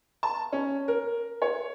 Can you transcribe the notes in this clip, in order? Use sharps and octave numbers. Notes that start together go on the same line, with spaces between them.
A5
C#4
A#4
C#5